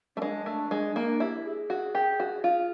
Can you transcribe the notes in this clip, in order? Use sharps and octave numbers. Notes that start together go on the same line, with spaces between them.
A3 C#4
G#3 D4
A3
G#3
A#3 D4
E4 G4
G#4
F#4
G4
F#4
F4